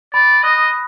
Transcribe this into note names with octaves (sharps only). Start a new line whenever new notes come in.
D5 B5
D#5 D#6 F#6 A#6